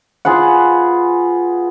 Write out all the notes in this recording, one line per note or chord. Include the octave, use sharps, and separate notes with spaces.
F4 G#4 B4 F#5